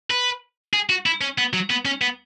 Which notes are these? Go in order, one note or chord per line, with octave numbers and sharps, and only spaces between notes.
B4
G#4
F#4
E4
C#4
B3
F#3
B3
C#4
B3